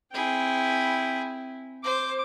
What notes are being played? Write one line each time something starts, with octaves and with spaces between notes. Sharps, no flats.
C4 E4 G#4 G5
C5 D6